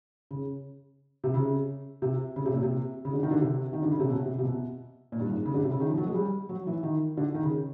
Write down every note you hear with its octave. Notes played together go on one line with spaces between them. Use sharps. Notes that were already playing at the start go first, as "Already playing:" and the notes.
C#3
C3
C#3
C3
C#3
C3
A#2
C3
C#3
D3
D#3
D3
C3
D#3
D3
C#3
C3
B2
C3
C3
B2
A#2
G2
G#2
C#3
D3
C3
C#3
D#3
F3
F#3
G#3
G3
F#3
E3
D#3
D3
D#3
C#3